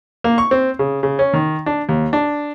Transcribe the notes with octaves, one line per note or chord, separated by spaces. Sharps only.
A#3
C#6
C4
C#3
C#3
C#4
D#3
D4
D#2
D4